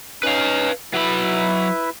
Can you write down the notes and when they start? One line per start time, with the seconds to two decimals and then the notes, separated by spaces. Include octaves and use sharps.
0.23 C#4 D#4 B4 F5
0.94 F#3 E4 B4 E5 B5